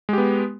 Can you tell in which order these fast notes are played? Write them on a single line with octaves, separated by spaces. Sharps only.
G#3 G4 B3